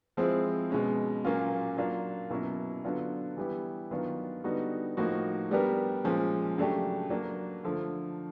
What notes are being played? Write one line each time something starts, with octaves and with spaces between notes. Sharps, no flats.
F3 G#3 C4 E4 G#4
B2 G#3 C#4
A#2 F#3 A#3 C#4 F4
F#3 A#3 D4 F4
B2 F#3 A#3 C#4 E4
D3 F#3 B3 D4 F4
E3 G3 B3 E4 G4
D#3 F#3 B3 D4 F4
D3 G3 B3 D#4 F#4
A2 F3 A#3 D#4 F#4
G3 B3 D4 G4 A#4
A#2 F3 G#3 C#4
C#3 F#3 A3 D4 G4
F#3 A#3 D4
D3 F3 A3